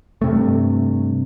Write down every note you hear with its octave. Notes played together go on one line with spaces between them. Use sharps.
G2 C3 A3